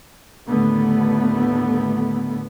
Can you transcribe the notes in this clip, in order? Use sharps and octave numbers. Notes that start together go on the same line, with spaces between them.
D#2 A2 D3 A3 B3